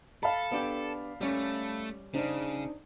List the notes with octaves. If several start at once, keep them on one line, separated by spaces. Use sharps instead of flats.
A4 F5 A5 B5
B3 D4 G4
G3 A3 C#4
C#3 D4 D#4 C5